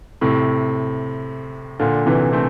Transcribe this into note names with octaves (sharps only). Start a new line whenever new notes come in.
A2 C3
A#2 D3
C3 E3
A3 C4